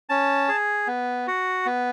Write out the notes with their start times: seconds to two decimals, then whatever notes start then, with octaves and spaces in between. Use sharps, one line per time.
0.09 C#4 A5
0.48 G#4
0.87 B3
1.27 F#4
1.66 B3